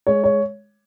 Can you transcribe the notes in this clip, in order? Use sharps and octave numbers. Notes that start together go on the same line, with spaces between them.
G#3 C#5
C#5